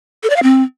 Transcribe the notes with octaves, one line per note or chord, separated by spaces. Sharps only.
A4
D5
F5
C4